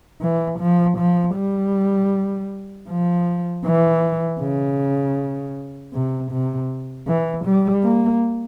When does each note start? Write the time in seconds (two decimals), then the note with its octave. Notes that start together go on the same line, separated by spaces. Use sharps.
0.21 E3
0.59 F3
0.98 F3
1.36 G3
2.89 F3
3.65 E3
4.41 C#3
5.94 C3
6.32 C3
7.07 E3
7.45 G3
7.84 A#3